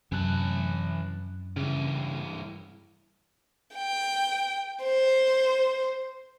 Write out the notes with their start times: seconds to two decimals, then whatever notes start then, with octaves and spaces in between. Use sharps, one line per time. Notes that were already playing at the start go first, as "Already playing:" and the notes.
0.12 F#2 C3 E3 A5 F#6
1.56 G2 C#3 E3
3.75 G5
4.83 C5